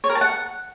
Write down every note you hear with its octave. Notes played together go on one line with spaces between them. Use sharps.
C#5
A#4
A5
F#5